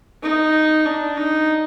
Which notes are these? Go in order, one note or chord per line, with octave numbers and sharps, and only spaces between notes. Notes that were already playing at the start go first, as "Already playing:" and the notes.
D#4
D4
D#4